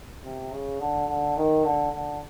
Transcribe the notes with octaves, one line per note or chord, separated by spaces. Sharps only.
C3
C#3
D3
D3
D#3
D3
D3